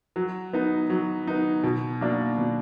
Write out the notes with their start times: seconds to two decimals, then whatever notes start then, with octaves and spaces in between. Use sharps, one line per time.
0.16 F#3
0.53 B3 D#4
0.90 F#3
1.27 B3 D#4
1.64 B2
2.01 F#3 A#3 D4
2.38 B2